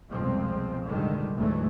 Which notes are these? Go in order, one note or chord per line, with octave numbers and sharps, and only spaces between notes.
C2 F2 B2 F3 G#3 C4
F1 A#2 D3 D#3 G3 G#3
D2 G#2 E3 F#3 G#3 A3